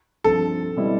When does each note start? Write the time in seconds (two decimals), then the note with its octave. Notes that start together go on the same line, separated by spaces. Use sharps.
0.24 G2 F3 C4 A4
0.76 B2 G3 C4 E4